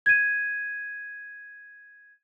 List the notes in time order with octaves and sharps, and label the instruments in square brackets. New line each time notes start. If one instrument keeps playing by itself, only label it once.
[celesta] G#6 D#7